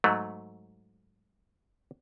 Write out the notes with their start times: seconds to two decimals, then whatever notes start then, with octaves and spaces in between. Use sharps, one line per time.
0.04 G#2 F#3 A3